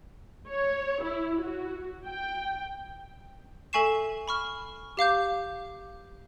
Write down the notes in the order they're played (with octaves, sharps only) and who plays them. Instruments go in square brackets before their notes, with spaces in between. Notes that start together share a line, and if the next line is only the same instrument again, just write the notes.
[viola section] C#5
E4
F#4
G5
[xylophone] A4 E5 G#5 C#6 C7 E7
B5 C#6 F6
G4 F5 D6 G6